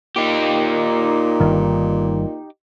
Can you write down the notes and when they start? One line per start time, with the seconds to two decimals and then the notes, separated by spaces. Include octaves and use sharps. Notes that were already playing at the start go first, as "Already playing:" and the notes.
0.16 A#2 D#4 G4
1.40 G1 G2 D#3